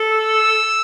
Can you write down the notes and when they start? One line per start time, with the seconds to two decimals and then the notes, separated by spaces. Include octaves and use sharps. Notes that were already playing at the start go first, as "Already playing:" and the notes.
Already playing: A4
0.12 E6